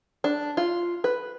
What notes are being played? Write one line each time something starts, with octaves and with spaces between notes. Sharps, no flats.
D4
F4
B4